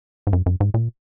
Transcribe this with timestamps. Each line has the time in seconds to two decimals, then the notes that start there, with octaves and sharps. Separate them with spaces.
0.27 G#2
0.33 F#2
0.46 F#2
0.60 G#2
0.74 A#2